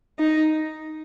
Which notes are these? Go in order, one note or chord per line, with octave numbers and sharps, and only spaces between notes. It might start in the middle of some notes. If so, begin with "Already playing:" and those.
D#4